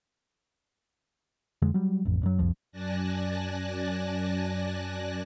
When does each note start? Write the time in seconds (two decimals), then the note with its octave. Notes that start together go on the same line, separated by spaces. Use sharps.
1.62 F2 D3 G#3
1.74 F#3 G3
2.05 A1 F2
2.23 F#2 F#3
2.39 F#1 C2 F2 F3
2.72 F#2 D5 G#5 A5 F#6 A#6